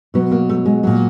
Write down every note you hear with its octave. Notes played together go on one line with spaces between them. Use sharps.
B2 F#3 B3
A#3
A3
G#3
A#2 F#3